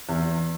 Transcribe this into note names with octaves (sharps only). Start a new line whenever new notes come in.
E2